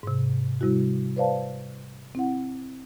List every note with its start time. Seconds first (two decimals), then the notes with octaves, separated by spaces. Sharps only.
0.03 G#2 C3
0.61 C3 G3 E4 F#4
1.17 B4 C5 D5 F5 A5
2.15 C4 E4 F#5